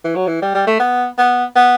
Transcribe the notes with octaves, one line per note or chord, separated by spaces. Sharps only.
E3
F#3
E3
G3
G3
A3
B3
B3
B3